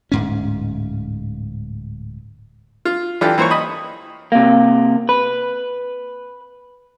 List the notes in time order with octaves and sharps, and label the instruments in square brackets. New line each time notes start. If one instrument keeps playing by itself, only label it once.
[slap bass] D1 G#2 C#4
[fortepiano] F4
E3 D4 F4 G4 A4
E3 A#3 C5 C#5 C#6
D#5 B5
[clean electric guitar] C3 A#3
B4